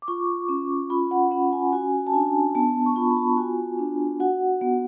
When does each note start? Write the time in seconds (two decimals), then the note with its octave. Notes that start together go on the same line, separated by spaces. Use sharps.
0.02 D6
0.08 F4 C#6
0.49 C#4
0.90 F4 B5
1.11 F#5
1.31 C#4 F#5
1.52 G#5
1.73 F#4 G#5
2.07 A5
2.14 D4 G#5
2.55 B3 A5
2.86 C#6
2.96 F4 B5
3.11 B5
3.17 A5
3.37 F#4 G#5
3.79 D4
4.20 F#4 F#5
4.61 B3